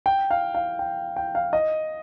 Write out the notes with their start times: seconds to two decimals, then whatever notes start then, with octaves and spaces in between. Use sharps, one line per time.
0.06 G5
0.31 F5
0.55 F5
0.79 G5
1.16 G5
1.35 F5
1.53 D#5